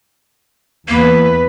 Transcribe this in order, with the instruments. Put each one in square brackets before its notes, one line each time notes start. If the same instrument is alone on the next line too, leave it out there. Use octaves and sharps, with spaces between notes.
[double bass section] E2 [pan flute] A#3 [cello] B3 B4